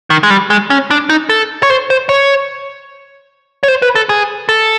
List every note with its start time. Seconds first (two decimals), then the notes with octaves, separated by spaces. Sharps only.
0.10 D#3
0.23 G#3
0.30 G3
0.50 G#3
0.70 C#4
0.91 D4
1.09 D#4
1.29 A4
1.63 C#5
1.70 C5
1.90 C5
2.09 C#5
3.63 C#5
3.68 C5
3.82 B4
3.95 A4
4.09 G#4
4.49 A4